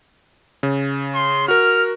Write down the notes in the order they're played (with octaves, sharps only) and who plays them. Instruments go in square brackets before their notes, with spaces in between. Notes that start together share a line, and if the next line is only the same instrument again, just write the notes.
[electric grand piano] C#3
[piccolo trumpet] C6
[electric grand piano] F#4 A#4 [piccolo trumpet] F6